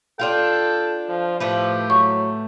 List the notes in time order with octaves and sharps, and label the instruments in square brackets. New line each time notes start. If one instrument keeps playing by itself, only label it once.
[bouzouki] D4 F4 F5 [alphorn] A4 [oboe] G5
[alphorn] F3
[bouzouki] A2 A3 B4 [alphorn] F3 [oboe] G4
[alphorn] F#3 [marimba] C#6